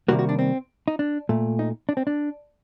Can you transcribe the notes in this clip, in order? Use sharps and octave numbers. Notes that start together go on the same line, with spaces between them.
C3 D#3 G3 A#3 F#4
F#4
D4
C4
D#4
D4
A#2 A3
D#4
D4
C4
D4